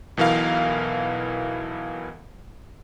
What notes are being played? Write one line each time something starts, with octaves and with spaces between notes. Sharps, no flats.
B1 B2 E3 A#4 F5